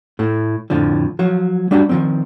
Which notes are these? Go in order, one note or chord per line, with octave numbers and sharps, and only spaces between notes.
A2 A3
F2 A2 D3 F3
F3 F#3
G3 D4 F#4 G4 A#5
D#3 F3 F#3 G#3 C4